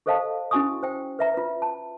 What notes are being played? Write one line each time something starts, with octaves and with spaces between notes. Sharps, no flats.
G4 A4 C5 D#5 F5 A5
C#4 E4 F#4 G#5 C#6 D#6
C5 G5
B4 E5 A#5
F4 B4
A5